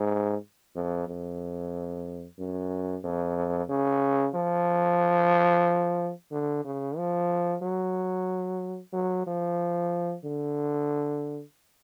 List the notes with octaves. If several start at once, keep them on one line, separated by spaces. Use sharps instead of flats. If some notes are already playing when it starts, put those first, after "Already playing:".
Already playing: G#2
F2
F2
F#2
F2
C#3
F3
D3
C#3
F3
F#3
F#3
F3
D3